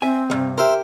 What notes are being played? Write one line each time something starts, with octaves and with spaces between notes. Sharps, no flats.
C4 E5 G#5
D2 G2 C3
G4 A#4 C5 E5